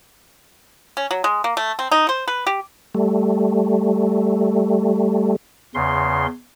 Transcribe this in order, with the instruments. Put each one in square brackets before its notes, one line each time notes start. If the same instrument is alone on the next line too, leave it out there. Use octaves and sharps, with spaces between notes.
[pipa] C#4
F#3
G#3
A#3
A3
C4
D#4
C5
B4
G4
[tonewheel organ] G3 A3
[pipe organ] E2 C#3 C6